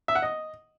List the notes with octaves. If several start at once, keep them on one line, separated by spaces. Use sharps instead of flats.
E5
F#5
D#5